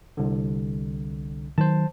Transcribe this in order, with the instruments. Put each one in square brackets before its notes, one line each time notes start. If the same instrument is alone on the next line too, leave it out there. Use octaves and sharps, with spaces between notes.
[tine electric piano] C2 D3
[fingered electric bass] D#3 F#3 [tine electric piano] C5 A5